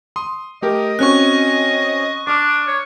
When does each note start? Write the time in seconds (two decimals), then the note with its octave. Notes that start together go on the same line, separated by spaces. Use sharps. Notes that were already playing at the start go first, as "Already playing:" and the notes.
0.16 C6 D#6
0.62 A3 G4 A#4 D#5
0.99 C4 C#4 F#4 C#6 F#6
2.27 D4 D6 F6
2.67 C#5